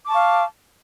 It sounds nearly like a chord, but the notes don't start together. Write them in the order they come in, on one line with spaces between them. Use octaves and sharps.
D6 A5 C#6 F5